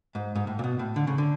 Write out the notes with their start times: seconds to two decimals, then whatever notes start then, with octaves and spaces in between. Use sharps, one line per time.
0.15 G#2
0.35 G#2
0.47 A2
0.59 A#2
0.64 B2
0.79 A2
0.96 D3
1.07 C#3
1.18 D3